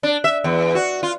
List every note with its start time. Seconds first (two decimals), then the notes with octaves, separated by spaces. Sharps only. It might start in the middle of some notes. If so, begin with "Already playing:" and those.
0.03 D4
0.24 E5
0.44 E2
0.75 F#4
1.03 F4